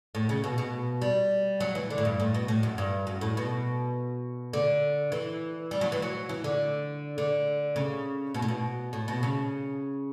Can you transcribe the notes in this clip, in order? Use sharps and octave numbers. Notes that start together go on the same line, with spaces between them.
A2
C#3
B2
B2
G3
F#3
E3
D3
A2
G2
A2
B2
A2
F#2
G2
F#2
A2
B2
D3
E3
G3
F#3
E3
F#3
E3
D3
D3
C#3
B2
A2
B2
A2
B2
C#3